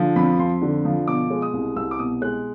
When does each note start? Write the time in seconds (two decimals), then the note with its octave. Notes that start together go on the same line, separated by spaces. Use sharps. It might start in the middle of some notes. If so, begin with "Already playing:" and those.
Already playing: D3 F3
0.16 F2 B5
0.39 F2 C6
0.61 D3
0.85 F3
1.07 B2 D6
1.30 G#3
1.42 D#6
1.53 C2
1.76 C2 E6
1.91 D6
1.99 B2 D#6
2.22 G#3 F#6